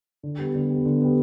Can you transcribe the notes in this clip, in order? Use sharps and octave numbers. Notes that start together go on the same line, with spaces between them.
D3
G3 B3
D3
G3 B3
D3
G3 B3